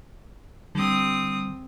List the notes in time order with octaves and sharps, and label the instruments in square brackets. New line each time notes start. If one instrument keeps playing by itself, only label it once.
[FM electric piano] D3 G3 [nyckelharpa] C4 D#6